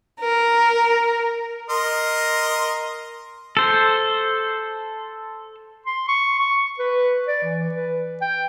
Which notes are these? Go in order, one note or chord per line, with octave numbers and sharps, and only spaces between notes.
A#4
A#4 D#5 C6
A4 C5
C6
C#6
C#6
B4
D5
E3
B4
G5